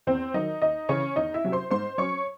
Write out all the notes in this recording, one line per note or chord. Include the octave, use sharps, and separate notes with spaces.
E2 C4 C5
D#3 F#3 D#4 D#5
D#2 D#4 D#5
C#3 E3 C#4 C#5
E2 D#4 D#5
E4 E5
C3 F#3 C#4
C5 C6
G#2 C5 C6
F#3 C#4 C#5 C#6